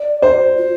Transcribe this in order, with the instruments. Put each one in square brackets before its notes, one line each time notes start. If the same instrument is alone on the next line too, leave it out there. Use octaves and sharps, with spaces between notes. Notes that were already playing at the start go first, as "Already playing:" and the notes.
Already playing: [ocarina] D5
[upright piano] C5
[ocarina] F4